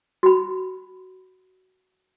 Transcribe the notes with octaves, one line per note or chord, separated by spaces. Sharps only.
F#4 B5